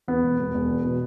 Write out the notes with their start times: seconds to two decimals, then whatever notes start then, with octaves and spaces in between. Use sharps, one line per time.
0.08 E2 B3
0.23 E1
0.39 E1
0.54 E1
0.70 E2
0.84 B2